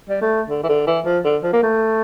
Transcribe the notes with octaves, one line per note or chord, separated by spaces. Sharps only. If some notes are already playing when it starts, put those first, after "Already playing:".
G3
A3
D3
E3
D3
E3
F3
D3
F3
A#3
A3